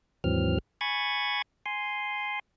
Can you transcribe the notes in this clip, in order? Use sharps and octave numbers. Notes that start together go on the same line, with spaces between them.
D#2 G#2 E3 F#3 C4 F6
G#5 B5 C#6 G#6 A6
G#5 C6